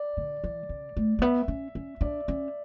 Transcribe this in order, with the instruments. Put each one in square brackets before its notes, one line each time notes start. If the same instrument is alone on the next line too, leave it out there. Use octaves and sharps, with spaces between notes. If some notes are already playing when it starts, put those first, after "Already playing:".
Already playing: [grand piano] D5
[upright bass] D3
E3
C#3
A3
A3
[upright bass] B3 [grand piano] E5
[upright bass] C#4
C#4
[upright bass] D4 [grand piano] D5
[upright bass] C#4